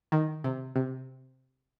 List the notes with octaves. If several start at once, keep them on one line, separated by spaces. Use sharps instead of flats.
D#3
C3
C3